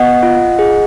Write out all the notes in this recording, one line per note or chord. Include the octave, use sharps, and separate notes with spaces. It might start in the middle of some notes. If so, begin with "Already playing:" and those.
Already playing: B3 D#5 F#5
F4
G#4